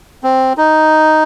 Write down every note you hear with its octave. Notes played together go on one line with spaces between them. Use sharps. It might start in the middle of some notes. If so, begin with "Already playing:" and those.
C4
D#4